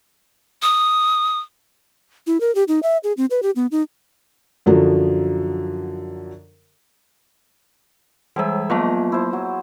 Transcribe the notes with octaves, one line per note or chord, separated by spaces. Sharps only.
D#6
E4
A#4
G4
D#4
E5
G#4
C4
B4
G4
B3
D#4
F#2 D3 F3 F#3
E3 G3 G#3 G#4 E5
F3 F#3 A#3 B3 A#5
E4 C5
F#3